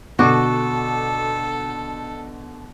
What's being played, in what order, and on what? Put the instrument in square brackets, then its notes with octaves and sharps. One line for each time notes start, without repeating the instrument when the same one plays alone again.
[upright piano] B2 D3 D6 [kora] F#4 [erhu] A4